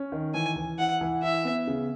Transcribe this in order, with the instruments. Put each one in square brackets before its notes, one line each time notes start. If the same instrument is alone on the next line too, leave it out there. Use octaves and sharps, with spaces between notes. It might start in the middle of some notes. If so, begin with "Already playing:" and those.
Already playing: [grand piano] C#4
D#3
[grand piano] E3 [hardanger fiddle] G#5
[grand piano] E3
[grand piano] E4 [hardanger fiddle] F#5
[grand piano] E3
[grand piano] E4 [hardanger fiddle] E5
[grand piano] B3
C#3